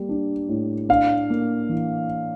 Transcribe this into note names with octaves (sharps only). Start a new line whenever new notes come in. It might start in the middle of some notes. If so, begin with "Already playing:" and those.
Already playing: G3 A#3
D4
A2
D4 F5
A#3
E3